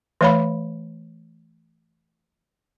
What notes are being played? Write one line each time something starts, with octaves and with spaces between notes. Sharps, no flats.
E3 A3 C#5 F5 B5